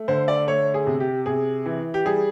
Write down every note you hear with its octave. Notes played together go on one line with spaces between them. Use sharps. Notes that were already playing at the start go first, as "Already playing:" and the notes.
Already playing: A3
D3 C5
D5
A3 C#5
G#4
C3
G4
C3 G#4
E3
G4
G3 G#4